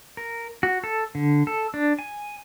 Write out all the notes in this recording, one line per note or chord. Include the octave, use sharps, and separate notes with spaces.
A#4
F#4
A4
D3
A4
D4
G#5